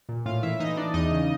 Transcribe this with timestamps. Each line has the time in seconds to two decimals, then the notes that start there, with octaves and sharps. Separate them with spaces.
0.09 A#2
0.26 A2 F4 F5
0.43 E3 E4 E5
0.60 E3 D#4 D#5
0.77 E3 D4 D5
0.94 E2 D#4 D#5
1.11 C#3